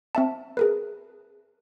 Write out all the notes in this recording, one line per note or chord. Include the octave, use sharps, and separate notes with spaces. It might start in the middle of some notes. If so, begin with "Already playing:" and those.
C4 E5 A5
G#4 A#4 B4